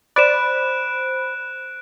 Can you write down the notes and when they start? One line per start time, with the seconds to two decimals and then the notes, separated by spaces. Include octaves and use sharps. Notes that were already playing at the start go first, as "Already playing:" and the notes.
0.16 C5 D5 B5 F#6 D7 E7